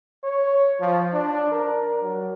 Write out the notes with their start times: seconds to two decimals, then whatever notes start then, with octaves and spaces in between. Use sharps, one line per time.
0.24 C#5
0.79 F3
1.13 D4
1.51 A#4
2.02 F#3